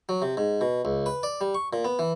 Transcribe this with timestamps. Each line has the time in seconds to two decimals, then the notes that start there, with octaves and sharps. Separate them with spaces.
0.09 F#3
0.22 C3
0.37 G#2
0.61 B2
0.85 C#2
1.06 B4
1.23 D5
1.41 G3
1.55 C#6
1.73 A#2
1.85 B3
1.99 E3